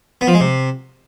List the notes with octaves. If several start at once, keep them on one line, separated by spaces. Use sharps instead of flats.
B3
F3
G#3
C3